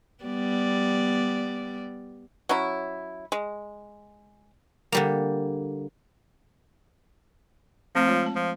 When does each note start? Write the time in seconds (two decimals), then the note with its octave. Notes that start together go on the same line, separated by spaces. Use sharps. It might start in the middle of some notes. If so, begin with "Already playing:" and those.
0.24 G3 B3 D5
2.49 F#3 C#4 E4
3.32 G#3
4.92 D3 G3 A#3
7.95 F3 A3 C4
8.08 G#3 F4 C#5
8.22 G#3 A5
8.36 F3